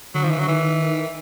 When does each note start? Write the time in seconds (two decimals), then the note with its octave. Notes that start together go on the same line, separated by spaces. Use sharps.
0.15 D3 F#3
0.23 F3
0.25 D#3
0.31 E3
0.37 D3 F#3
0.48 D#3 E3